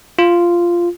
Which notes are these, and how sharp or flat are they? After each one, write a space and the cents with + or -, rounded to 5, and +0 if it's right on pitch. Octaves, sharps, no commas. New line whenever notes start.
F4 -10